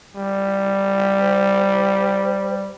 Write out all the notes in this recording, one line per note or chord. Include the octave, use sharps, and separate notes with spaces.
G3
C5